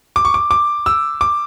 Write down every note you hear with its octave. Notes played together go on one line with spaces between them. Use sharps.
D6
C#6
D6
D6
E6
D6